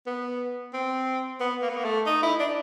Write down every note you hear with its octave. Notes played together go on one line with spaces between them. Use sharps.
B3
C4
B3
A#3
B3
A#3
A3
D#4
E4
D4